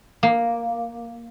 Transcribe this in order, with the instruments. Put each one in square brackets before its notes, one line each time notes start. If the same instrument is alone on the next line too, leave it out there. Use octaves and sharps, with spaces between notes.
[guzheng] A#3